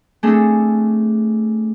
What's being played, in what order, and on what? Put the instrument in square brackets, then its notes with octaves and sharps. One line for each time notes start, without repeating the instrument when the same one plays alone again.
[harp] A3 C4 D4 G#4 A4